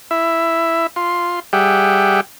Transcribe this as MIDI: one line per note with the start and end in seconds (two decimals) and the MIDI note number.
0.11 0.87 64
0.11 0.87 76
0.96 1.40 65
0.96 1.40 84
1.53 2.21 55
1.53 2.21 67
1.53 2.21 68
1.53 2.21 76
1.53 2.21 78
1.53 2.21 79